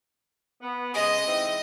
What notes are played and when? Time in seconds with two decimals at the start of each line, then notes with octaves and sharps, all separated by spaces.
0.62 B3
0.94 C#3 G#3 G#4 D#5
1.27 G#2 E3 C4